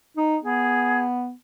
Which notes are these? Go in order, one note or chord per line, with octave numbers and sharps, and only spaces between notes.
D#4
B3 G#4